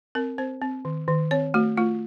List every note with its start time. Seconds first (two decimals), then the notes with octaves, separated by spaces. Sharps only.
0.15 C4 A#4
0.38 C4 C5
0.62 C4
0.85 D#3
1.08 D#3
1.31 C4 C#5
1.54 A3 F#4
1.77 A3 F4